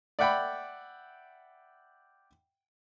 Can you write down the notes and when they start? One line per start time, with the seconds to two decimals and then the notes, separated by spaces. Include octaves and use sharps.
0.19 D5 E5 F#5 G5 B5